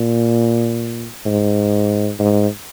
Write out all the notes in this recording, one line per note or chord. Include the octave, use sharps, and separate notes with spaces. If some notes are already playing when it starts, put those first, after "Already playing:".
Already playing: A#2
G#2
G#2